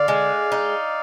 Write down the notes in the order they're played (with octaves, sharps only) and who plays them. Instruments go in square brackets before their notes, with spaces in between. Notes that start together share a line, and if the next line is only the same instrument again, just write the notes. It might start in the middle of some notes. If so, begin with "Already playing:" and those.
Already playing: [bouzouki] D3 [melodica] D5 F5
[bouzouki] G#3
D#4